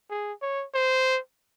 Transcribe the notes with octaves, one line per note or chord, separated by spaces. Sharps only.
G#4
C#5
C5